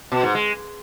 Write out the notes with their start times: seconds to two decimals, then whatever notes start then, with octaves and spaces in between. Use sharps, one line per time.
0.12 B2
0.23 G#2
0.35 G#3